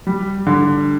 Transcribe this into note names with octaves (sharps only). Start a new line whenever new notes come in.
G3
D3